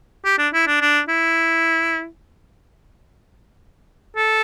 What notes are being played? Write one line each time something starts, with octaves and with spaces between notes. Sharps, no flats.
G4
D4
E4
D4
D4
E4
A4